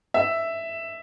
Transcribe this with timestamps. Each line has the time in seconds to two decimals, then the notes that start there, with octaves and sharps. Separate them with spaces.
0.14 E5